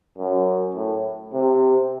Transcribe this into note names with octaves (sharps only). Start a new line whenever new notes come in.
F#2
A2
C3